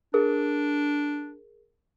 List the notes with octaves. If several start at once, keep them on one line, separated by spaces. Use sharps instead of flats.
D4 G#4 A#4